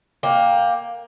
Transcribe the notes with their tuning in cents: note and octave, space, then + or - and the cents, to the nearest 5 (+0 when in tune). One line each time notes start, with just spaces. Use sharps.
A#3 +10 G5 +25